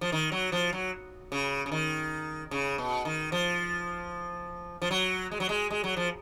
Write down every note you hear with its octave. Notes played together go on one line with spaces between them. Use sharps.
F3
D#3
F#3
F3
F#3
C#3
C#3
D#3
C#3
B2
D#3
F3
F3
F#3
G#3
F#3
G#3
G#3
F#3
F3